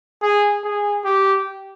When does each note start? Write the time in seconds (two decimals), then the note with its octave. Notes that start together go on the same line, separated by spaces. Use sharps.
0.23 G#4
0.64 G#4
1.05 G4